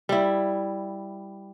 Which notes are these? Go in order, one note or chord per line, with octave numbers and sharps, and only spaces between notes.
G3 E4